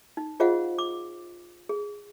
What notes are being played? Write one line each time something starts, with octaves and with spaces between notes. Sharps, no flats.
D#4
F4 G#4 C5 D#5 F5 F#5
D6
G#4